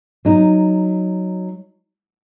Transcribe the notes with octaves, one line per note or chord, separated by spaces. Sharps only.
F#3 D#4